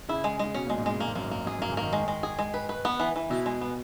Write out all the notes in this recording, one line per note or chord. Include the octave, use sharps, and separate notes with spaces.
C#3 E4
G#3
C#3 G#3
B2 C#4
A#2
G#3
G#2
C#3 G#3
A#2 A#3
G#2
F#2 A#3
G#2
A#3
F#2 G#4
F#2
A#3
G#2
D#3 A#3
D#3 G#3
G#3
G#4
G#3
B4
B4
B3
E3
E3
B2 E4
G#3
B3